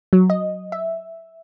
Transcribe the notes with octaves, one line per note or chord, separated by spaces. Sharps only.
F#3
D#5
E5